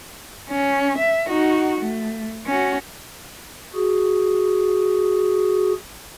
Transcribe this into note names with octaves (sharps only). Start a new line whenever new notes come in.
C#4
E5
D#4 F#4
A3
C#4 F#4
F#4 G#4